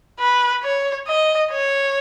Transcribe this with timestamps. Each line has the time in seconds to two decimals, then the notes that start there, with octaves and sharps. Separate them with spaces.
0.20 B4
0.63 C#5
1.07 D#5
1.51 C#5